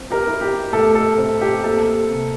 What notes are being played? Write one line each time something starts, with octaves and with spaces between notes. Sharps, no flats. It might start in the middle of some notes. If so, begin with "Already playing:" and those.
Already playing: C4
G4 A#4
E4
G4
A2 A4
A4
C4
G4
A#3 A4
C3